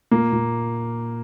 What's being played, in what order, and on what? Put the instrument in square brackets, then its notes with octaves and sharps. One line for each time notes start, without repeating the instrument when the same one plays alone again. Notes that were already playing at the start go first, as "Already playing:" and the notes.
[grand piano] A#2 A#3
A#2